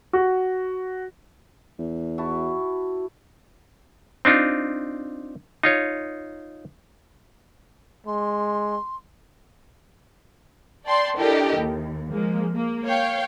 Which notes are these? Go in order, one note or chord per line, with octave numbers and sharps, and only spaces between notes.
F#4
E2
E4 F#4 A5
C4 D4 D#4 F4
D#4 F4 C#5
G#3 C6
D5 G5 A5 C6
D4 E4 G4 A4 A#4 D#5
D#2
F3 G#3 A#3
A#3
C#5 F5 G5